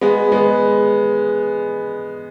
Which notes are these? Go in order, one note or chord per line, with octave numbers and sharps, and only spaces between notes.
G#3 B3
G#3 B3